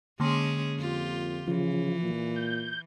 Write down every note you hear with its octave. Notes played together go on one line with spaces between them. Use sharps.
D3 G#3 A#3 C#4 G#4 C6
F2 F4 G4
C#3 E3 F3
A#2
G6